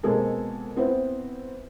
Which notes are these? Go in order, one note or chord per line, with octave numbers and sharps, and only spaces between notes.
B2 G#3 A#3 C4 G#4 A4
B3 C4 E4